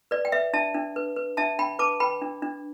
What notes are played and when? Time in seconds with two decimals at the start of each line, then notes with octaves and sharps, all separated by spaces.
0.11 B4 D5
0.25 G5
0.32 B4 E5
0.53 D4 E5 A5
0.74 D4
0.96 B4
1.16 B4
1.37 D4 E5 A5
1.59 D4 G5 B5
1.79 B4 A5 D6
2.00 B4 G5 B5
2.22 D4
2.42 D4